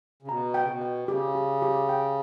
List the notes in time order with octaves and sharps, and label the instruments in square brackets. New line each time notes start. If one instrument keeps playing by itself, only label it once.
[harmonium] C#3
[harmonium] B2 [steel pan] A#5
[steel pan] G5
[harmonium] C#3
B2
[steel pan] G5
[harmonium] C#3 [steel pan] G4
[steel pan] G4
G4
G5